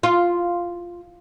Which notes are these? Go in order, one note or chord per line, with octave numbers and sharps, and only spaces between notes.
F4